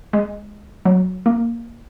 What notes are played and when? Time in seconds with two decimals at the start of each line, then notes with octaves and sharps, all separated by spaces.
0.13 G#3
0.85 F#3
1.26 A#3